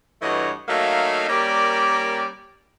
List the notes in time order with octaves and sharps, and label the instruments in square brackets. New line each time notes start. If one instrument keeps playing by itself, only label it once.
[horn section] G2 E3 A3 F#4 C#5 D#5
F#3 A3 A#3 D#4 E5 F5
G3 A#3 C#4 G4 A#4 D5